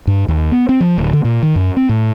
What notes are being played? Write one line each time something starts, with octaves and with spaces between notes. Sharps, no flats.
G2
D#2
B3
C4
F3
D1
D3
A#2
D#3
F#2
C4
A2